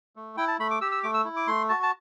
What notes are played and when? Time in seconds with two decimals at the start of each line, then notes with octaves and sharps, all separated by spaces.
0.16 A3
0.37 E4 G5
0.48 A5
0.59 A3 B5
0.71 D6
0.81 G4 E6
0.92 E6
1.03 A3 D6
1.14 E6
1.25 E4
1.36 D6
1.47 A3 C6
1.69 F#4 A5
1.83 A5